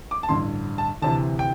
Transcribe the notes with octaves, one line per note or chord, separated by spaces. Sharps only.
D6
A5
A1 G2 D3 C6
A5
D2 C3 E3 A5
G5